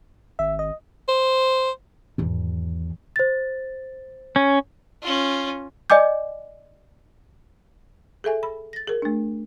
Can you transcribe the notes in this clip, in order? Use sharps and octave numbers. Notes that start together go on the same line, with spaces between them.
G#1 E5
D#5
C5
G#1 E2
C5 A6
C#4
C#4 F4
D5 D#5 G#5 D6 G6
G#4 A4 E5 G#5
B5
A6 A#6
G#4 A#4
A3 D4